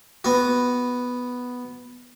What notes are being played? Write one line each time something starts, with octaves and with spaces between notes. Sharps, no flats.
B3 F#4